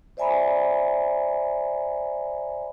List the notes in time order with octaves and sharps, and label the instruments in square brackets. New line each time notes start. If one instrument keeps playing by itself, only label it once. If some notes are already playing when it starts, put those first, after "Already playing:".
[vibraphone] C5 D5 E5 G#5 A#5 B5